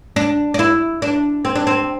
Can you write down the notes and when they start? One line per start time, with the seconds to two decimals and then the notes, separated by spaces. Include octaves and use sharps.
0.16 D4
0.54 D4
0.59 E4
1.02 D4
1.45 C4
1.55 D4
1.67 C4